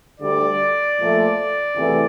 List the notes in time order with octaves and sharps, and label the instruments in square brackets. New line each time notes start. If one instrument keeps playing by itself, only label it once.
[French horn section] D2 D3 G3 [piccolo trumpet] D5
[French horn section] A#2 F3 A3
E2 C3 E3 A3